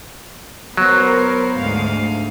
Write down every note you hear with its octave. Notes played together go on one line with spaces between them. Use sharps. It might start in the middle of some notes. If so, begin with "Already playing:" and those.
F#3 B3 A#4 C5
D2 G#2 F5